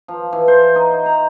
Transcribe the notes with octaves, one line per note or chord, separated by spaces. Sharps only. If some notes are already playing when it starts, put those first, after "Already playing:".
F3
E3
C5
D#4
A#5